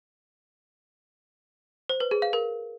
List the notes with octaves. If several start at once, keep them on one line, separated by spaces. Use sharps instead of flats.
C5
B4
G#4
F5
A#4